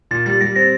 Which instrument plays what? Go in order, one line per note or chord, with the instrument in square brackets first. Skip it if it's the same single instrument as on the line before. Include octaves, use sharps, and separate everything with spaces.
[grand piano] A#2 [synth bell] A6
[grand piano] G3 [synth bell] A6
[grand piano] G3 [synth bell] A#6
[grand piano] C4 [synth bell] A#6